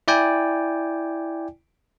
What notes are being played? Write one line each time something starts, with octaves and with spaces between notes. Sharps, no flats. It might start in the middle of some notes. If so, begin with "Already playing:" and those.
E4 D5 G5 G#5